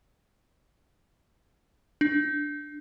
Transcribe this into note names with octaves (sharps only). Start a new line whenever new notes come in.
D4